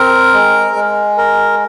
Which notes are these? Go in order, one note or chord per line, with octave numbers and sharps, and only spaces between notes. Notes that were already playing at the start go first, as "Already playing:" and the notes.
Already playing: C4 A#4
G#3
G#3
A#4